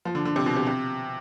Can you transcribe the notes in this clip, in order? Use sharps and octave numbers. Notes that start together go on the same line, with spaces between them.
F3
D3
D3
C3
B2
C3
C3